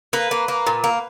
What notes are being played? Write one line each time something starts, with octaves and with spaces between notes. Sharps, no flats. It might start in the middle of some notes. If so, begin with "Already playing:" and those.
A#3 B4
A#3
A#3
A#2
A#3